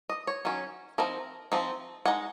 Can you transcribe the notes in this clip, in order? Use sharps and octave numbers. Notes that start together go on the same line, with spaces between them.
D#5
C#5
D#3 F#3 C#4
F3 C4 D#4 A#4
F3 C4 D#4
G#3 D#4 F#5